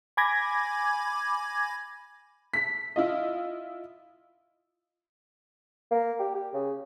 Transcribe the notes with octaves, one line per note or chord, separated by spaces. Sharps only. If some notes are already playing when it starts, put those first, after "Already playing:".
G#5 B5 D6 G#6 A#6
B6
E4 F4 D#5
A#3
G4
G4
C#3